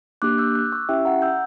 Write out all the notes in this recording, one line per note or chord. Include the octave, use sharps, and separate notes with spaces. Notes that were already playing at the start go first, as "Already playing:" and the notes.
A#3 D4 G4 D6 F#6
E6 G6
D6 F#6
C#6 E6
C#4 E4 G4 E5 G5
F#5 A#5
E6 G6